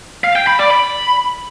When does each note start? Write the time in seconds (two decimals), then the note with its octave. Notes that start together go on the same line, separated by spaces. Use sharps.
0.24 F5
0.36 G5
0.47 B5
0.59 D5
0.71 B5